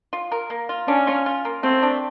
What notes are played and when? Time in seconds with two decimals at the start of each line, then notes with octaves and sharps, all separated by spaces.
0.13 F4
0.32 A#4
0.50 A#3
0.69 F4
0.88 C#4 D4
1.07 F4
1.26 F4
1.45 A#3
1.63 A3 C4
1.83 D4